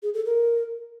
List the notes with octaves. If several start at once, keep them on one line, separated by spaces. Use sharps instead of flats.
G#4
A4
A#4